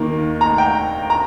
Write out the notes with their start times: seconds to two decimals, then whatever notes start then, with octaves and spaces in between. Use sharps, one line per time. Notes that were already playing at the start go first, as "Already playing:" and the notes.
Already playing: D#2 D#3 A#3
0.41 A#5
0.58 G5
1.10 A#5